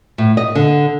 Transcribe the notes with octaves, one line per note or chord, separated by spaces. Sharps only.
A2
D#5
D3